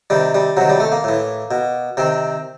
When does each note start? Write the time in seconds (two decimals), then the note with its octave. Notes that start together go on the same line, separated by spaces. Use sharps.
0.10 C3 D#3 G3
0.35 G3
0.57 C3 D#3 F#3
0.70 G3
0.80 A3
0.92 A#3
1.04 A2 E3
1.51 B2
1.97 C3 D#3 C4